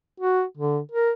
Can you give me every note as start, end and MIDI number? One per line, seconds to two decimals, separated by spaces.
0.20 0.44 66
0.57 0.79 50
0.92 1.12 70